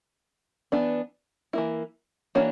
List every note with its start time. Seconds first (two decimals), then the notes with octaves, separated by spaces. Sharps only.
0.72 E3 B3 D4
1.53 E3 A#3 E4
2.35 E3 A#3 D4 F#4 C#5